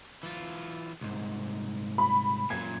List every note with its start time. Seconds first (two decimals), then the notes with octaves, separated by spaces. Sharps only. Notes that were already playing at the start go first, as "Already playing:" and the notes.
0.23 E3 F4
1.01 C2 G#2
1.98 B5
2.50 F#2 A#2 G#6